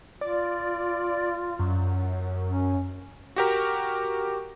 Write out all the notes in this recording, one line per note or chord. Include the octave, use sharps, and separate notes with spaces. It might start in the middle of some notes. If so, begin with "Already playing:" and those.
F4 D5
F#2
C#4
F#4 G4 A#4